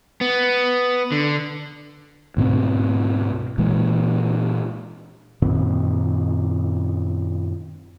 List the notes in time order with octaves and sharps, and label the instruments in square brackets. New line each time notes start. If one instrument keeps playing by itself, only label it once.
[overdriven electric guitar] B3
D3
[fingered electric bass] D2 G#2 B2 C4
A#2 E3 G#3
F#2 A#2 D#3 C4